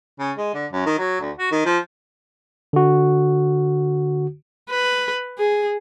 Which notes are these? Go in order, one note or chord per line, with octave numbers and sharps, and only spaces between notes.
C#3
G#3
D3
F#2
D#3
F#3
D2
F#4
D#3
F3
D3 F#4
B4
G#4